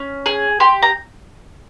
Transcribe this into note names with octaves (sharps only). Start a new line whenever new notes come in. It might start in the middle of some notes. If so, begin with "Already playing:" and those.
Already playing: C#4
G#4
G4 C6
A#5